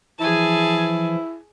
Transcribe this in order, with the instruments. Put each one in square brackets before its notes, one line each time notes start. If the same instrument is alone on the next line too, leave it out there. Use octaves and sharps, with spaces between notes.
[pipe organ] E3 F3 [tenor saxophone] E4 [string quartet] G#4 G#5 A5